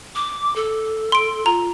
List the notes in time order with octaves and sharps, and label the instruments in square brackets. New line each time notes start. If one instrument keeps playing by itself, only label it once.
[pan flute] D6
A4
[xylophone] C6 D7
[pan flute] F4 [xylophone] A#5